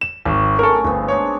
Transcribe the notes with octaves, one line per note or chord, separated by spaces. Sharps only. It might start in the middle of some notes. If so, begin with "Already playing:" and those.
E7
G#1 F#3
C#3 A3 A4 A#4
G1 D3 B3 C4
G#3 D4 D#4 C#5